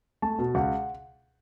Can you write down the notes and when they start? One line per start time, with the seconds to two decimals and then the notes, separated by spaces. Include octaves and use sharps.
0.22 A3 A5
0.39 B2
0.55 C#2 F#5